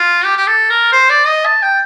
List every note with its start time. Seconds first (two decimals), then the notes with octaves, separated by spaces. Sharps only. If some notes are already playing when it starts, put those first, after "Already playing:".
Already playing: F4
0.25 G4
0.37 G4
0.47 A4
0.70 A#4
0.92 C5
1.10 D5
1.27 D#5
1.45 A5
1.62 G5